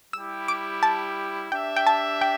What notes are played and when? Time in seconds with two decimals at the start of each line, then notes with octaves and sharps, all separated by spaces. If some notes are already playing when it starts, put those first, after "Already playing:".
0.13 G3 E4 G4 E6
0.48 D6
0.83 A5
1.52 D4 G4 E5 G5
1.76 G5
1.87 A5
2.21 G5